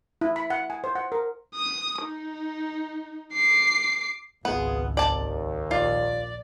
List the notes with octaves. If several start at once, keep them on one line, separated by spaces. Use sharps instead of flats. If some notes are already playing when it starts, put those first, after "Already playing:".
E4
B5
F#5
G#5
C5
F#5
A#4
D#6
D#4
D6 C7
G#1 C#2 B2 B3 F4 G#4
D#2 D5 A5
A#1 F4 D5